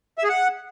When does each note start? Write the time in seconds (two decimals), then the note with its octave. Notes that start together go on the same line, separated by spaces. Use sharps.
0.18 E5
0.24 G#4
0.29 F#5